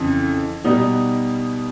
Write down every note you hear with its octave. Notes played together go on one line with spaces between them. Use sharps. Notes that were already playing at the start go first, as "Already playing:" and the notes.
Already playing: F2 C#3 E3
B2 G3 B3 D#4